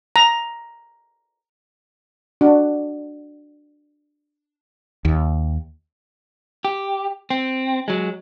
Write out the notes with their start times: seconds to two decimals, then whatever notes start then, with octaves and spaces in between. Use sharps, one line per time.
0.16 A#5
2.41 D4 F#4
5.05 D#2
6.65 G4
7.30 C4
7.88 F#3 G#3